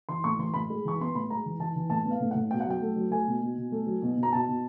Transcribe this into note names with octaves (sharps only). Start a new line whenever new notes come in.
E3 C6
A2 C#6
E3 C6
A2 B5
G#3
E3 C#6
B3 C6
A2 B5
G#3 A#5
E3
E3 A5
E3
A2 A5
B3
F5
A2
A2 F#5
B2 G5
F#5
F#3 G5
A3
F#3
A3 G#5
B2
B2
B2
A3
F#3
B2
B2
A#5
B2 A5
B2